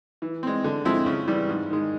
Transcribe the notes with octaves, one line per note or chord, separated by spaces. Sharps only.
E3
G#3 C4
D3
F3 G#3 C4 E4
C#3
E3 G3
G#2
D#3 G#3